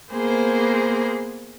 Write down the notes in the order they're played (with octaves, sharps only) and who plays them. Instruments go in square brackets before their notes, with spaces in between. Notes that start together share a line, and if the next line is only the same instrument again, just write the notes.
[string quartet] A#3 B3 G#4 C5